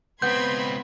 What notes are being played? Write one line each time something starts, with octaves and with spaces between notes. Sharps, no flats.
C#2 B3 C4 B5 C6 G6 G#6